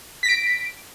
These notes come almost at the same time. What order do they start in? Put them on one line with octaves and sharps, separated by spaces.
B6 A#6 D7